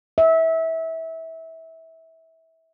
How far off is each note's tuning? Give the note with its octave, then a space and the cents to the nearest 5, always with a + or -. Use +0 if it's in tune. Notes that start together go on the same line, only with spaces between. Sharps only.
E5 -20